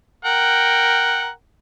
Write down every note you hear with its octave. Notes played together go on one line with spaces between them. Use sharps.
A#4 F#5 G5